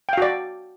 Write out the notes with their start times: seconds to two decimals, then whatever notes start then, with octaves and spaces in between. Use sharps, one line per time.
0.09 G5
0.13 F5
0.18 F#4
0.22 D5